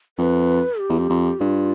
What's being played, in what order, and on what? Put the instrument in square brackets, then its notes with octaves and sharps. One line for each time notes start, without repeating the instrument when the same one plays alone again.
[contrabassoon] F2 [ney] B4
[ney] G4
[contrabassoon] E2
F2
F2
[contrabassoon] G2 [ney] F4